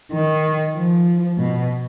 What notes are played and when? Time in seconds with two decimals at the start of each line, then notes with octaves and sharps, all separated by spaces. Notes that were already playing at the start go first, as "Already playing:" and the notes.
0.11 D#3
0.75 F3
1.38 B2